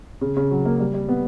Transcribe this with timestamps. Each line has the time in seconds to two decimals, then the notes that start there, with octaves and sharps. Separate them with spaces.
0.21 C#3
0.37 C#3
0.51 F#3
0.65 A#3
0.80 G3
0.94 G3
1.09 B3